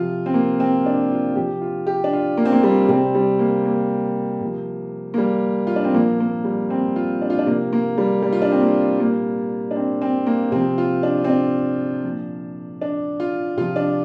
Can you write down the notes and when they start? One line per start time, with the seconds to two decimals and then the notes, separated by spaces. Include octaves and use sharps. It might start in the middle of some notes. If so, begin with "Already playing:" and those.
Already playing: C3 F3 F4
0.26 C4
0.34 A#3
0.60 C4
0.86 D4
1.11 F4
1.36 C3 F3 G4
1.62 F4
1.87 G4
2.04 D4
2.13 F4
2.37 A#3
2.45 C4
2.53 A#3
2.63 G3
2.88 C3 G3 C4
3.15 G3
3.39 A#3
3.65 A#3
4.41 C3 F3
5.14 A#3
5.18 G3
5.67 F4
5.76 D4
5.84 C4
5.94 A#2 F3 A#3
6.20 A#3
6.44 G3
6.70 C4
6.96 F4
7.22 D4
7.30 F4
7.39 D4
7.46 C3 F3 A#3
7.73 A#3
7.98 G3
8.23 G3
8.33 F4
8.42 D4
8.51 C4
8.62 A#3
8.99 A#2 G3 A#3
9.71 D4
9.76 C4
10.01 C4
10.27 A#3
10.51 C3 F3 C4
10.78 F4
11.03 D4
11.24 C4
11.28 D4
12.04 A#2 F3
12.82 D4
13.20 F4
13.57 C3 F3 F4
13.76 D4